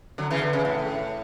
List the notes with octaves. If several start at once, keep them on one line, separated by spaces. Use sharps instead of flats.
D3 F#3
C#3 E3
D3
C#3
A2